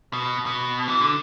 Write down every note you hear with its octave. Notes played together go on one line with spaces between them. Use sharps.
B2
B2
E3
D3